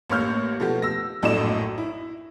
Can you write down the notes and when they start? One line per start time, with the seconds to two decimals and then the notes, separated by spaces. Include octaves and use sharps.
0.09 A1 A#3 C#5 F6 G6
0.60 B2 F3 A3 B3 G4
0.82 E6 A#6
1.22 A#1 F#2 A2 D5 D#5 E7
1.78 E4